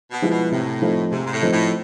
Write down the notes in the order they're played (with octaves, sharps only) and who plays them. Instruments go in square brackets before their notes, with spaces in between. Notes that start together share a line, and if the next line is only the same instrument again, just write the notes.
[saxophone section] B2
[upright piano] F3 G#3 B3 E4
[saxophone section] B2
[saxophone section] A2 [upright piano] C3
[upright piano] F3 A3 C4 D#4
[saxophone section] G#2 [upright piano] C3
[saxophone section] G#2
A2
[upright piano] F3 A3 C4 D#4
[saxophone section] A2